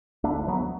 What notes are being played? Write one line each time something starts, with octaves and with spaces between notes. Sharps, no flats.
D2 A3 D4
F#3 B3